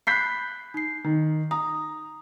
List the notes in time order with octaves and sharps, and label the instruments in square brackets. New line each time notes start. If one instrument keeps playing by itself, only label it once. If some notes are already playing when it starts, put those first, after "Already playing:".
[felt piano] B5 G6 B6 [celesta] F#6 C7
[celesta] D#4 C7
[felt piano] D#3
[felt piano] A#5 [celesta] D#6